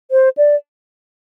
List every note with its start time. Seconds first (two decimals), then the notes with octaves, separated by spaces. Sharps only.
0.11 C5
0.37 D5